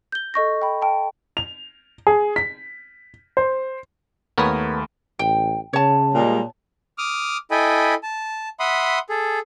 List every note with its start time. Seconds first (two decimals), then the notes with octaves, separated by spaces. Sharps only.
0.12 G6 G7
0.34 A4 D#5 C#6 A#6
0.62 G5 B5
0.82 G5 A5
1.37 F7
2.07 G#4
2.36 B6
3.37 C5
4.38 D#2 A3 B3 A#4 C#5 B5
5.19 A1 G5
5.73 C#3 C#5 A5
6.13 A#2 G3 G#3
6.98 D6 D#6 F6
7.51 E4 A4 D#5 G5 G#5 B5
8.03 A5
8.60 E5 F#5 B5 C6 D#6
9.09 G#4 A4